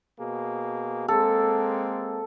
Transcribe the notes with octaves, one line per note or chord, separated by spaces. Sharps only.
B2 A#3 G#4
G#3 A#3 C4 A4